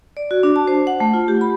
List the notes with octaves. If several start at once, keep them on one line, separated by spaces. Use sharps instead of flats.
D5
F#4
D4
A5
C5
F#5
A3
F4
G4
B5